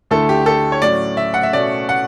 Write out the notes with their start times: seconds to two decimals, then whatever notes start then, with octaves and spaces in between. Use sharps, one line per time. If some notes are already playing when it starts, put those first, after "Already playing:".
0.11 D2 D3 A3 E4 A4
0.29 G4
0.46 A4
0.72 C#5
0.82 A2 F#3 C#4 D5
1.17 E5
1.34 F#5
1.43 E5
1.53 B2 A3 C#4 D5
1.89 F#5